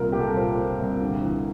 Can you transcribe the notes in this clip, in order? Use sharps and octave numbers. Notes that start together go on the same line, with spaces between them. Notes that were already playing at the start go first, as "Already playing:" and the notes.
Already playing: C2 A#2 A#4
C2 G4
A4
A#4
A#2 C5
A#2
C2
D2
E3